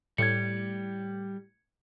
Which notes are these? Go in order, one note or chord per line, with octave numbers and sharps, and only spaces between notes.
A2 G3 G#6 C#7